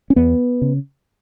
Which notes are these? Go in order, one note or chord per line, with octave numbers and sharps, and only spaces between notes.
C#4
E2 B3
C#3